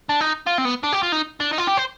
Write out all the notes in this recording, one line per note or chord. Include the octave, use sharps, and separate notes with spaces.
D4
D#4
F4
C4
B3
D4
G4
F4
D#4
D4
D#4
F4
G4
C5